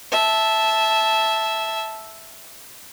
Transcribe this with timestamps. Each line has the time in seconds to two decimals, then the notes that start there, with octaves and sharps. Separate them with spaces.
0.12 E5 A5